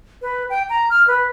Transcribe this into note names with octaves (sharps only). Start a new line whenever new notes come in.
B4
G5
A#5
F6
B4